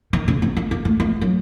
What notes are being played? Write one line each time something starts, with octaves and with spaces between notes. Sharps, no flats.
D#3
C#3
C4
A#3
A#3
A3
A#3
F#3